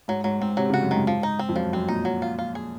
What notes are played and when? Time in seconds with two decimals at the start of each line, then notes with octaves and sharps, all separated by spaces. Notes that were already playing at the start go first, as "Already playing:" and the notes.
0.08 G#2 F#3
0.24 G#2 F#3
0.41 G#2 C4
0.57 C3 F#3
0.70 C#3 F#4
0.83 F#2
0.91 G#2 D#3
1.07 F3
1.23 D#4
1.39 C4
1.49 F2
1.56 F#2 F3
1.73 F#2 C4
1.88 A#2 D#4
2.05 F#3
2.22 F4
2.39 F4
2.55 G#4